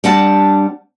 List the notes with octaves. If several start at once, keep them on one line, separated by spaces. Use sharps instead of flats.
G3 C4 D4 F#5 A5